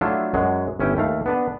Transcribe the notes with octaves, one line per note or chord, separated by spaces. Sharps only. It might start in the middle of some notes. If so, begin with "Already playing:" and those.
F#3 A3 D4 E4 F4
F#2 F#3 G#3
G1 C#4 E4 G5
D#2 A3 F5
B3 D4 B4